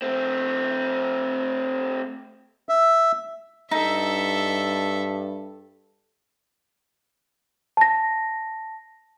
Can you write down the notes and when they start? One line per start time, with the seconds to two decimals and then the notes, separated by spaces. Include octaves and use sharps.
0.02 A3 C4
2.69 E5
3.71 G2 D#4 A4 E5
7.77 A5 A#6